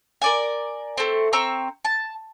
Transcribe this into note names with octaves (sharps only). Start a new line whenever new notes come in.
A#4 D5 G#5
A3 C4
C4 A#5 C#6 E6
A5